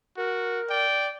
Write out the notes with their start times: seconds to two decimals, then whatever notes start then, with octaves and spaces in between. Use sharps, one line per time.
0.17 F#4 A#4
0.70 D5 G5